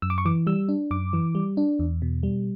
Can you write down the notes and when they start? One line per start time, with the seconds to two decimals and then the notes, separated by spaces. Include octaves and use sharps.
0.02 F#2 E6
0.10 D6
0.18 C#6
0.25 E3 D6
0.47 G3 E6
0.69 D4
0.91 F#2 D6
1.13 E3
1.35 G3
1.57 D4
1.79 E2
2.02 B2
2.23 G3